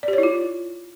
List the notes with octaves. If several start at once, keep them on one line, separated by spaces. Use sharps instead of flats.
D5
G4
C#5
E4
F4